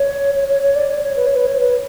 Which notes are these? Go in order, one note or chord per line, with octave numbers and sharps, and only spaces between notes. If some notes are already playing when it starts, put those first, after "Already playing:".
Already playing: C#5
C#5
C#5
C#5
D5
C#5
C#5
B4
C#5
B4
C#5
B4